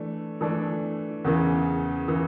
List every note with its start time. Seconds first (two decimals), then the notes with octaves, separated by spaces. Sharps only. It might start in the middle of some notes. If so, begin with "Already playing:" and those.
Already playing: E3 A3 D4
0.41 E3 A3 D4
1.25 E2 C#3 E3
2.08 C#3 E3